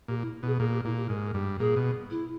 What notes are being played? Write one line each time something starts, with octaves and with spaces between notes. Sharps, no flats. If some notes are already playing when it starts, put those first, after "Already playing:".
A#2 G4
E4
B2 G#4
A#2 G#4
G4
A#2 E4
G4
G#2 A#4
G2
A#2 G#4
B2
E4